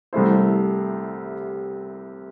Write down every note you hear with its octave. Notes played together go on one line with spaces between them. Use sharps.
C2 C3 A3 E4 C5